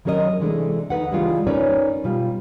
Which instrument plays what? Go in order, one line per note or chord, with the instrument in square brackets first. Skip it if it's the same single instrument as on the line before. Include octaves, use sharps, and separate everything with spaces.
[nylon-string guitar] D#3 F#3 C#4 A#4 C5 D#5
C3 E3 G#3 A3 D4
D2 D#4 B4 F#5
C#3 E3 G3 G#3 D4 F4
C#4 D#4 A#4 B4 C#5 D5
B2 G3 F4